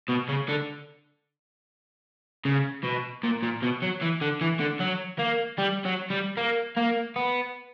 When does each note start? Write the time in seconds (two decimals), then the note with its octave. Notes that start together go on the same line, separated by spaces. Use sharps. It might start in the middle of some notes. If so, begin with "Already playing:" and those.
0.09 B2
0.29 C#3
0.49 D3
2.45 C#3
2.83 B2
3.23 A#2
3.42 A#2
3.62 B2
3.82 F#3
4.01 E3
4.21 D3
4.41 E3
4.60 D3
4.80 F#3
5.19 A#3
5.59 G3
5.85 F#3
6.10 G3
6.37 A#3
6.77 A#3
7.16 B3